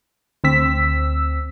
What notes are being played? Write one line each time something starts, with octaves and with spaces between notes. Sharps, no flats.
D2 C4 E6 B6